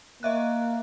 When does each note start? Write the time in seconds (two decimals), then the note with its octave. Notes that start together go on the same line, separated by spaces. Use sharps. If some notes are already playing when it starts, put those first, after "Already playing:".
0.23 A#3 D#5 E5 F#6